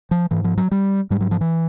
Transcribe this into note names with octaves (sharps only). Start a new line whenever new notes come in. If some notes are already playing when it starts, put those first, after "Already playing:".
F3
G#2 E3
F3
F#3
G3
G#2 G3
F#3
F3
E3